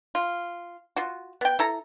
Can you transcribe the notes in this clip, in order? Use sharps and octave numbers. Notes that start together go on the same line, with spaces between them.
F4
F4 F#4
B3 G5
E4 A4 A#5